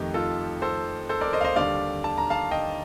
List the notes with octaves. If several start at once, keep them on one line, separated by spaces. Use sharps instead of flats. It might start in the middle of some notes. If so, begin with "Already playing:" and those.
Already playing: F2 D#3 A3 D#4 G4
F4 A4
A4 C5
A4 C5
A#4 D5
C5 D#5
F5
C5 D#5
D#2 D3 G3 D5 F5
A5
A#5
F5 A5
D#5 G5